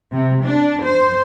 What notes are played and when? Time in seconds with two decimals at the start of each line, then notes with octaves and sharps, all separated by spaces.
0.12 C3
0.44 D4
0.84 C5